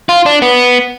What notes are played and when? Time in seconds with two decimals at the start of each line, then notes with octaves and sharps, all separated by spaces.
0.09 F4
0.26 D4
0.42 B3